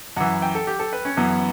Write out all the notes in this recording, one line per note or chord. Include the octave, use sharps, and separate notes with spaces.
F#2 E3 F#5
G5
A4
G4
A4
B4
C#4
F#2 E3 B3